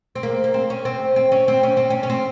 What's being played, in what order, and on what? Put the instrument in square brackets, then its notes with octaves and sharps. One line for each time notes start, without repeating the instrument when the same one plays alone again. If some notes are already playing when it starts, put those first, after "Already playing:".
[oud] C4
A#3
A#3
C4
C#4
C4
C4
C#4
C4
C#4
C4
C#4
C#4
C4